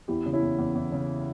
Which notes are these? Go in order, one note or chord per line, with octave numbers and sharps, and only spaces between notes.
E2 E4 G4
C#3
C#4 E4
E2
E2
E2
C#3